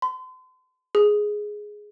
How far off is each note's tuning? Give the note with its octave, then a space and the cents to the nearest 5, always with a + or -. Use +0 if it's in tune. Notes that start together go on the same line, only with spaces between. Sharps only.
C6 -40
G#4 +5